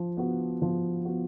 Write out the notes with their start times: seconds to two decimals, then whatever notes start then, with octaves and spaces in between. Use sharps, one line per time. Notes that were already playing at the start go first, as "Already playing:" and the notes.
Already playing: F3
0.17 B3 F#4
0.62 F3
1.05 B3 F#4